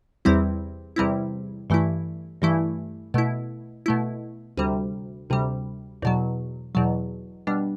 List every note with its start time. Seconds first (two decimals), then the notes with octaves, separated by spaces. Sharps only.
0.25 E2 C3 G3 C4 E4
0.96 E2 C3 G3 C4 E4
1.70 G2 E3 A3 E4
2.42 G2 E3 A3 E4
3.14 B2 A3 E4
3.86 B2 A3 E4
4.57 D2 C3 G3
5.30 D2 C3 G3
6.02 E2 B2 F#3
6.75 E2 B2 F#3
7.47 B2 G3 D4